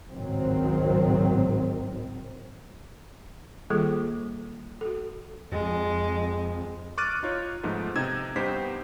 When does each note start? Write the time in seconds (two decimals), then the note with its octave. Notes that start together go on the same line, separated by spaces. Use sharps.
0.12 G#1 C#2 A2 D#3 F#3 C4
3.70 D#3 G3 A#3 F4 G#4 A4
4.81 F#4 A4
5.52 F2 G#3
5.84 F2
6.98 C#6 D6 F6 F#6 A6 D#7
7.23 D#4 F4 C#5
7.63 G#2 F3 A3 B3 D#4
7.96 C3 D#4 E6 G#6
8.36 G2 B3 D#4 G4 C5 B6